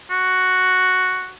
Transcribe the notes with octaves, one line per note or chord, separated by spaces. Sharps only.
F#4